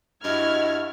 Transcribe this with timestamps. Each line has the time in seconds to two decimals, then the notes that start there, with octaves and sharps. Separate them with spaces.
0.24 G2 E4 F#4 D#5 F6 G#6